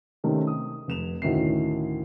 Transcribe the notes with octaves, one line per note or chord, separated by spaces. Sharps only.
C3 D#3 A3 C4 C#4
D#6
F1 E7 F7
D2 A2 D#3 C#4 E5 C7